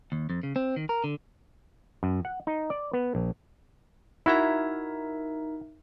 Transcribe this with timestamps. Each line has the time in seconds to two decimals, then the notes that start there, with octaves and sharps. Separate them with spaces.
0.12 D#2
0.30 F2
0.43 C#3
0.56 C4
0.76 D#3
0.89 A#4
1.04 D3
2.03 F#2
2.25 F#5
2.47 D#4
2.70 D5
2.93 B3
3.15 A#1
4.26 D#4 E4 F#4 A#4 E5